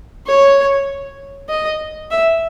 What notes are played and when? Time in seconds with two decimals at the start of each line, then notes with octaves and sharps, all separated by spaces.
0.27 C#5
1.49 D#5
2.11 E5